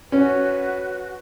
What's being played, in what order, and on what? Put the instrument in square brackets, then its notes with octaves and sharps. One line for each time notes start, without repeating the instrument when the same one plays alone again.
[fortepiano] C#4 [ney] F#4 [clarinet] B4